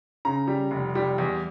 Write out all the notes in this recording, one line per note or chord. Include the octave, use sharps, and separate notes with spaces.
C#3 A#5
G3
F1
G3
E2